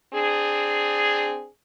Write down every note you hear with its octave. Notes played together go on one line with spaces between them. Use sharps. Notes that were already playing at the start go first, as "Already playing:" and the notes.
C4 D4 G#4